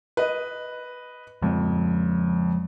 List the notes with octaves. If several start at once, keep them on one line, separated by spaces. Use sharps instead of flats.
B4 D#5
F2 F3 G#3